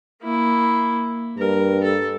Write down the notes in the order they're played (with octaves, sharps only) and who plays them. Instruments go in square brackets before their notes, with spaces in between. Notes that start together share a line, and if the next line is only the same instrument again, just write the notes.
[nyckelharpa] A#3 E4
[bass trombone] G2 [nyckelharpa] A#4
[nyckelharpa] A4